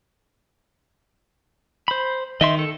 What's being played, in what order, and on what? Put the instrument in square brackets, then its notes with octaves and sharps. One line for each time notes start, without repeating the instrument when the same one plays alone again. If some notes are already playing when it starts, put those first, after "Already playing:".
[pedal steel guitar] C5 B5
[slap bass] D#3 [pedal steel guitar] D#5 E5 C6
[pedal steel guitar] A4